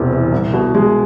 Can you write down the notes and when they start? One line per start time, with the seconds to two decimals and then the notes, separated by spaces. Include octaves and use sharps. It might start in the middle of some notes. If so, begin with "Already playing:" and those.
Already playing: E1 E2 C3
0.11 E3
0.32 C2
0.53 B2
0.75 G#3